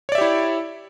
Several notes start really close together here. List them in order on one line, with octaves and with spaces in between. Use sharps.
C#5 D5 E5 G4 E4